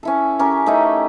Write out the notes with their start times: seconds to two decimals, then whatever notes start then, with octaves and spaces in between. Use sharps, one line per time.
0.03 C#4 E4 A4
0.39 C#4 G4 A#4
0.66 A3 D#4 E4